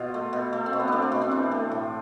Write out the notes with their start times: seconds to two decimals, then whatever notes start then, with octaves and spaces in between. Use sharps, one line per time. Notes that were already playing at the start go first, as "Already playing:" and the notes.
Already playing: B2 F4
0.14 A3
0.33 B2
0.53 A3
0.66 C4
0.73 B2
0.79 B3
0.88 A3 C4 D4
1.02 D4
1.12 B2
1.22 C4
1.31 E3 D4
1.51 A3
1.71 A2